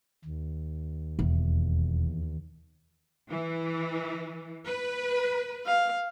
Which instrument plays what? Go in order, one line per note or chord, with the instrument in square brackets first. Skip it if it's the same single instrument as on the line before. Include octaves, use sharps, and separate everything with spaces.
[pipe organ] D#2
[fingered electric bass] E1 [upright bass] E2
[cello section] E3
B4
[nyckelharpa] F5